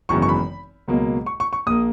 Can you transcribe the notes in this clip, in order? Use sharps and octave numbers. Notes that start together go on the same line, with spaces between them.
G#1 F#2 C#3 E3 B3 C#6
C#6
B5
C#2 B2 F#3 A#3
C#6
C#6
C#6
A#1 A#2 A#3 D#6